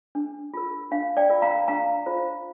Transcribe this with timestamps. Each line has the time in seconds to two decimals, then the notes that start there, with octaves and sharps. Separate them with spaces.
0.15 D4
0.54 F4 A#4
0.91 D4 F5
1.17 D5 G5
1.30 F4 A#4
1.42 F5 A#5
1.68 D4 F5 A#5
2.06 F4 C5